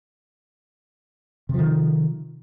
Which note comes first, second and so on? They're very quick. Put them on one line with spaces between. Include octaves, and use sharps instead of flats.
C3 F3 D#3